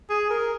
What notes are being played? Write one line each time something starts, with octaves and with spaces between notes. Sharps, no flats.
G#4
A#4